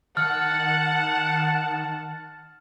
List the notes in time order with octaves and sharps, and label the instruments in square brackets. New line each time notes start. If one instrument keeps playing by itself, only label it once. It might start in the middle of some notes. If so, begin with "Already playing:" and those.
[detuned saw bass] D#3 [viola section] F#5 [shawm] A5 [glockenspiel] F6